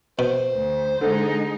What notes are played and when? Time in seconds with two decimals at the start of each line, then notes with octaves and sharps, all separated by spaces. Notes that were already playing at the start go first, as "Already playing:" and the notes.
0.19 B2 C5
0.54 D2
1.01 D3 G#3 D#4